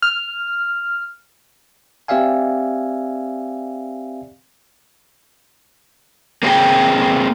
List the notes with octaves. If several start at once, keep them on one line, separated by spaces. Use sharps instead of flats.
F6
C4 G4 D5 E5 F5 G#5
A#3 C4 F#4 G#4 G5